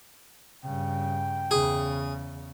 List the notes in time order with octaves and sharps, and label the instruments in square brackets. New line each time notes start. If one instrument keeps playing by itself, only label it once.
[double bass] G2 C#3 [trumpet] G5
[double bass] E2 C#3 [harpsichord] G#4